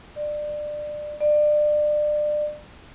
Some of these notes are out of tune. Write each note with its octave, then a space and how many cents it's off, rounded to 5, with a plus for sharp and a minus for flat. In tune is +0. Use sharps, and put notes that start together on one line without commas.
D5 +25
D5 +30